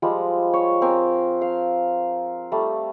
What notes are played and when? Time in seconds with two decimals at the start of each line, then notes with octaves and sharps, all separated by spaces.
0.02 F3 G3 G#3
0.53 C#5
0.82 C4 A#4 G#5
1.41 F5
2.52 G3 A3